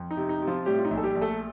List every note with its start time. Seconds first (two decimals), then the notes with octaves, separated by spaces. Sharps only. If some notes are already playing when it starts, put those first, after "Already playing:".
Already playing: F2
0.11 D#4
0.17 C3
0.29 D#4
0.42 C3
0.47 F3 F4
0.66 A2 G3 G4
0.78 F4
0.85 D#4
0.91 A#1
0.97 A4
1.03 G3 G4
1.15 A#1
1.21 A3 A4